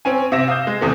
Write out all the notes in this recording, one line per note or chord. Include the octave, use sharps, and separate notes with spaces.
C4 C#4 G#5
C3 E5 E6 A#6 E7
F5 D#6 G6
G#3
E2 C3 A3